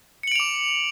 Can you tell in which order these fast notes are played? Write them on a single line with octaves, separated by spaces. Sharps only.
C#7 F#7 D7 F7 D6